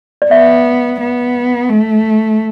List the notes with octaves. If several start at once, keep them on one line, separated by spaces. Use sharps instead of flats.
D5
B3 E5
B3
A3